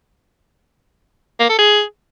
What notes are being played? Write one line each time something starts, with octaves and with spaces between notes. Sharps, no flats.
A#3
A4
G#4